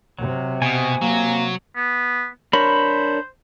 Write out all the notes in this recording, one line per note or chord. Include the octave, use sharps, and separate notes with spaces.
C3 F#3
B2 G#5 D#6
F#3 A#3
B3
D4 A#4 C5 C#5 B5